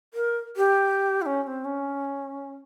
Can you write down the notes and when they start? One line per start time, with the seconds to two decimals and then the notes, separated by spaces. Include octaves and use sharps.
0.14 A#4
0.57 G4
1.22 E4
1.26 C#4
1.43 C#4
1.47 C4
1.65 C#4